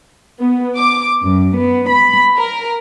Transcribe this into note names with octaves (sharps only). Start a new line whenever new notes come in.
B3
D6
F#2
B3
B5
A#4